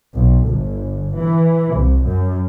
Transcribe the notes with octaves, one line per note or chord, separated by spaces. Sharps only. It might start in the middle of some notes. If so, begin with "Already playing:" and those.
B1
G1
E3
C2
F#2